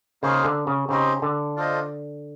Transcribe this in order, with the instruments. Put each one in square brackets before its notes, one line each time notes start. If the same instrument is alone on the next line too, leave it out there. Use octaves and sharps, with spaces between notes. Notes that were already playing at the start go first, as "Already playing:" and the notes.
[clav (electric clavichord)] C#3 [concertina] A#3 D#4 G#4 C5 F5
[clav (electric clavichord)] D3
C#3
[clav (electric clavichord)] C#3 [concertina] C4 D#4 G4 C5 D#5
[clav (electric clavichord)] D3
[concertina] D4 F4 A4 C5 D#5